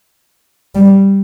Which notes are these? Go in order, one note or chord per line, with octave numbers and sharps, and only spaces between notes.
G3